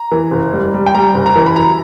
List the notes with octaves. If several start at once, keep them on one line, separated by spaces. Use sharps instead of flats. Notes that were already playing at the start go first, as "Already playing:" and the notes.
Already playing: A#5
E3
F#1
G3
G3
G5
G3 A#5
F#1
A#5
E3
B5
F#2 A#5